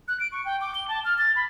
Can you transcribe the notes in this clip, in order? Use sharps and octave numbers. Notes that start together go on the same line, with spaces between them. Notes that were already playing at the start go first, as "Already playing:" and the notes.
F#6
D7
C#6
G5
D6
G7
A5
F6
A6
B5